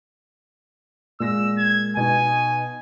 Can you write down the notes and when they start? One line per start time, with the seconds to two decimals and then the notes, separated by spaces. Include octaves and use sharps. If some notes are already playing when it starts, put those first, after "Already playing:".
1.20 A#2 G#3 E6 A#6
1.57 G#6
1.97 B2 D#4 G#5